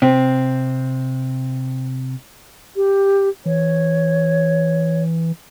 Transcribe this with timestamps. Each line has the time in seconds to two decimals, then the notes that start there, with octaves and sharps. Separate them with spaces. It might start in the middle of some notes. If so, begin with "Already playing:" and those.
0.02 C3 C4
2.76 G4
3.46 E3 C#5